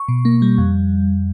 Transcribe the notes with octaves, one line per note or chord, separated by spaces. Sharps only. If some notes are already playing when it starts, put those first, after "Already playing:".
Already playing: C#6
B2
A#3
G3
F2